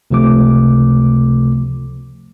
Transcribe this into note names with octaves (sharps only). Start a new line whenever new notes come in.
C#2 C3 F3 A3 D6